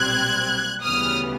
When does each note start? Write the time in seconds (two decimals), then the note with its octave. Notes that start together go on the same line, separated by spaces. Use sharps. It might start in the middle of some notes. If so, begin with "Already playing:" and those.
Already playing: B1 A#2 G3 C4 F#6 G#6
0.83 D2 C#3 E3 G3 B3 D#6 F6